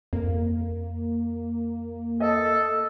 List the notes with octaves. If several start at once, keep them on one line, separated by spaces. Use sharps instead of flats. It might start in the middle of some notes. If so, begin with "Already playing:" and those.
F2 A#3
A4 D#5